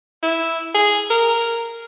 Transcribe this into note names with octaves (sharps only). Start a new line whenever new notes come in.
E4
G#4
A#4